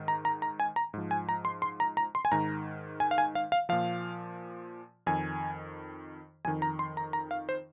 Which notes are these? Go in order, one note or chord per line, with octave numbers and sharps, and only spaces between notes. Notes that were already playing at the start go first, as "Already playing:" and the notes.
Already playing: G#2 D#3
A#5
A#5
A#5
G#5
A#5
G#2 F3
G#5
A#5
C6
C6
A#5
A#5
C6
G#5
G#2 D#3 A#5
G#5
F5
G#5
F5
F5
A#2 F3 F5
F2 D#3 G#5
F2 D#3 G#5
A#5
C6
A#5
A#5
F5
C5